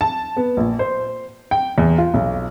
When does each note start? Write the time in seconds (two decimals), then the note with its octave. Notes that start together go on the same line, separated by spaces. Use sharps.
0.01 A5
0.37 B3
0.57 A#1
0.79 C5
1.51 G5
1.78 E2
1.98 F4
2.14 B1